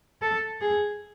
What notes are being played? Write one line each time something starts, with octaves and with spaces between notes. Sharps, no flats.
A4
G#4